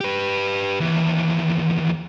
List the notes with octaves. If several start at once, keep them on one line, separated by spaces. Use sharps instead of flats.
G4 B4
D#2 E3